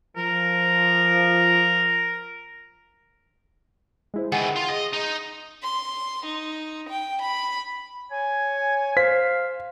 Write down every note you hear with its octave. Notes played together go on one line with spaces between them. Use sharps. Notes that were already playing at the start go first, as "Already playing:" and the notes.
F3 A#4
G#3 E4 C5
D#3 E3 G#4 F#5 G#5
F4
D#5
D#4
C6
D#4
G5
B5
C#5 G#5
C5 F5 B6